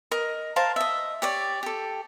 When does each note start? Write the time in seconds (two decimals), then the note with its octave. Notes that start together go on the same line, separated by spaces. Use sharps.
0.11 A#4 D#5
0.56 A#4 C5 F5 A5
0.76 D#5 E5
1.22 G4 C#5 D5
1.63 G4 A4